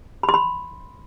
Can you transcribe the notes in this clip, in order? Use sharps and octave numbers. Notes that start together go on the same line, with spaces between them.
B5
C6
B5